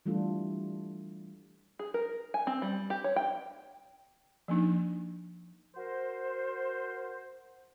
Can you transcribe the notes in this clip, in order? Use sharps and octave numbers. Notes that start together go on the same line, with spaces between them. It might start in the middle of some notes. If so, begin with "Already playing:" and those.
E3 G3 A3 D4 F4 A4
G#4
A#4
G#5
C4
G3
G4
C#5
G5
F3 A#3 D4 D#4
F#4 A#4 C5